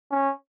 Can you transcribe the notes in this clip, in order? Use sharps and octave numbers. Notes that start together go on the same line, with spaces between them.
C#4